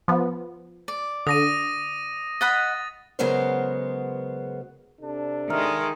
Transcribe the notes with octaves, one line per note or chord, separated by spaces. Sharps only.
F3 B3
D5
D3 D#6 A#6 D#7
D#5 F#5 B5 A6
C#3 F#3 G#3 B3 A#4 C5
C3 D4 A4
D#3 G#3 E5 A#5 F6